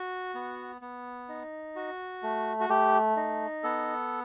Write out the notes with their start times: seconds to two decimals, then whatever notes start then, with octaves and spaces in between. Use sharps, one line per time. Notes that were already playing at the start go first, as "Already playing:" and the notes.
Already playing: F#4
0.35 B3
0.81 B3
1.29 D#4
1.76 F#4
2.23 A3
2.60 F#4
2.69 A3 G4
3.17 D#4
3.64 B3 A4